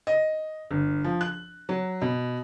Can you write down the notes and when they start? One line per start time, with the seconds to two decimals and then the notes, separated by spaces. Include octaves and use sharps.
0.07 D#5
0.71 G1
1.04 F3
1.21 F#6
1.69 F#3
2.02 B2